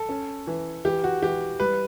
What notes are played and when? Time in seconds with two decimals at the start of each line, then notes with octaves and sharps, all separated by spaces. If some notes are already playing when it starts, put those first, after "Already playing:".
Already playing: A4
0.09 C#4
0.47 E3
0.85 E3 G4
1.04 F#4
1.23 E3 G4
1.60 G3 B4